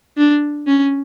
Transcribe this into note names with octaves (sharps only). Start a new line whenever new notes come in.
D4
C#4